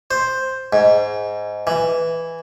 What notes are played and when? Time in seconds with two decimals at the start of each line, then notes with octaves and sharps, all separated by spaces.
0.11 C5
0.73 G#2
1.67 E3